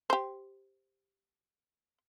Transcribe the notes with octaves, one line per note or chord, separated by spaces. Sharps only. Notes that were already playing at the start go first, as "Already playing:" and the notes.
G4 C5